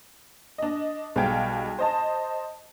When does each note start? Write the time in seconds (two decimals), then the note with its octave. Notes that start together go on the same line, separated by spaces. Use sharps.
0.58 D4 D#5
1.16 B1 G3 G#4 F5 G5 G#6
1.79 C5 D#5 A5